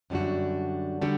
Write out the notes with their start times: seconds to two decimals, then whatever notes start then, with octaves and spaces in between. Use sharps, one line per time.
0.10 F#2 D3 G3 D4 F#4
1.02 D3 G3 D4 F#4